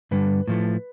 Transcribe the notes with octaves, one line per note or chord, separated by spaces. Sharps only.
G2 D3 G3 B4
A2 F3 A3